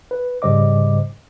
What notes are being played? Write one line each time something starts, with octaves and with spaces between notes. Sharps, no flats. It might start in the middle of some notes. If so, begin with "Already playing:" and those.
B4
G#2 C#3 G3 C5 D#5 D6